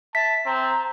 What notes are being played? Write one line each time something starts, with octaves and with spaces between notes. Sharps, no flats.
E5 A5 B6
C4 A#5